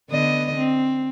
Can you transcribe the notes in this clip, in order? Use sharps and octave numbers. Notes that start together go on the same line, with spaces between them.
D3 B3 D#5
C4